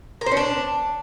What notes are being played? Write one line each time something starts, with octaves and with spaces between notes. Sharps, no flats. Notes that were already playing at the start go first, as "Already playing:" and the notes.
A#4
C5
C#4
D4